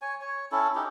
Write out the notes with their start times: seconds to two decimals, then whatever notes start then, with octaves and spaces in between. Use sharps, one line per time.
0.02 C#5 G#5
0.21 C#5
0.52 C#4 E4 A4
0.75 C#4 D#4 G4